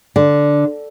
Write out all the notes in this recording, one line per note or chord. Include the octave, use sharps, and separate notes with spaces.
D3